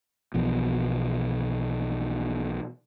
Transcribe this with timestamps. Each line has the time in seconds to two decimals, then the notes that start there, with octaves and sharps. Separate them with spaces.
0.34 B1 B2 E3 F3